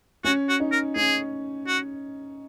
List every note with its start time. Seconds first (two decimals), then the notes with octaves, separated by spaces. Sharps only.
0.24 C#4 F#4
0.49 F#4
0.60 D#4
0.72 A#4
0.96 C#4 G#4
1.67 F#4